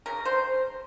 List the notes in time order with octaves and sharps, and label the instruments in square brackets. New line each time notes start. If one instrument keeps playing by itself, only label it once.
[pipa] C#3 A#4
C5